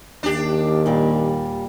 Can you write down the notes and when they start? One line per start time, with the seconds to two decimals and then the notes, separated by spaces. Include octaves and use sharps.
0.23 D#2 D4 G4
0.86 A#2 G3